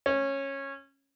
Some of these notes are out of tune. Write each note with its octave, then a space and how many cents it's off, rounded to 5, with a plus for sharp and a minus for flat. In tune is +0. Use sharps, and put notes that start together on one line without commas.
C#4 -15